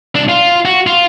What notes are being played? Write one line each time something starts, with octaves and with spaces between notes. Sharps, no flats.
C2 D4
F4
F#4
F4